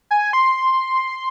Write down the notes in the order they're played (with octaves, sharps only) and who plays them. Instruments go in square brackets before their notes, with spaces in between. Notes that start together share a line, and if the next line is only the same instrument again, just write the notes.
[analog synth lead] G#5
C6